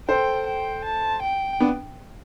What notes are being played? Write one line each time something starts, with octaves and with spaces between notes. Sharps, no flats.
A4 C5 G5
G5
A5
G5
B3 D4